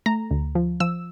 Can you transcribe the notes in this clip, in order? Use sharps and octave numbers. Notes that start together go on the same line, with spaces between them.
A3 A#5
D2
F3
F3 E6